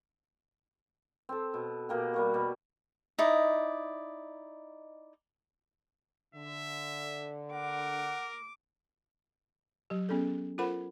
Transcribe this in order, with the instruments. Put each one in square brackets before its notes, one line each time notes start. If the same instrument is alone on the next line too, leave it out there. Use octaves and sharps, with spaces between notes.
[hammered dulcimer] C4 A4
B2
B2 A#3 G4
G3 A#3 F#4
B2
[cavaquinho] D#4 E4 D5 D#5
[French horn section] D3 [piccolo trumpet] E5
[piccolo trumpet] A#4 [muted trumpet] F#5 [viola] D6
[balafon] F#3 G4
B3 C#4 G#4 A4
F4 A4 A#4 C5 F#5 B5